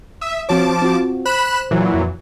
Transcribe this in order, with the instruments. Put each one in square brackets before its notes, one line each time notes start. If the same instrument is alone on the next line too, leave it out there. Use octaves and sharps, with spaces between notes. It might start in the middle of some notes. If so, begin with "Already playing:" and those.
[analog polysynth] E5 [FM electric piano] D#6
[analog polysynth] F3 A5 D6 [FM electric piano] C4 F#4 C#5
[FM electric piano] C4 F4 F#4
[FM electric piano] C5 [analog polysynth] B5 F#6 E7
[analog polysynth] A#2 E3 F#3
[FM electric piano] F2